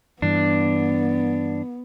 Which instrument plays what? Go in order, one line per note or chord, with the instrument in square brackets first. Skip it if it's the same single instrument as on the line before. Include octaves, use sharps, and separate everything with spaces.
[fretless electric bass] G2 E3 [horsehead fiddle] B3 [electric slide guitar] D4